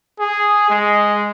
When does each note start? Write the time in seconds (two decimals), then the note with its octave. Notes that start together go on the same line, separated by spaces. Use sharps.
0.20 G#4
0.70 G#3